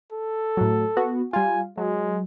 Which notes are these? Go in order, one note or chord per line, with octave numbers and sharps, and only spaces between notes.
A4
A2 F#3
B3 F#4
G3 F4 G#5
F#3 G#3